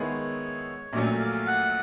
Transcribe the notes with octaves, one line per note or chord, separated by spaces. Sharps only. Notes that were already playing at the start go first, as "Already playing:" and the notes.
Already playing: D#3 G#3 B3 E4 G#4 C#5
A#1 A#2 F#3 A3 C#4 D5
F5
F#5